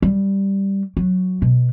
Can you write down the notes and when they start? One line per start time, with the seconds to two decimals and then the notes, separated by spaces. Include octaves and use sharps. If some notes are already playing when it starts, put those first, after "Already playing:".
0.02 G3
0.97 F#3
1.42 B2